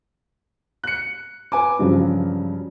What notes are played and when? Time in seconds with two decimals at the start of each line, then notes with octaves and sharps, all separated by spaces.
0.84 F#6 C#7
1.52 B4 G#5 D6
1.79 G2 C#3 F3 F#3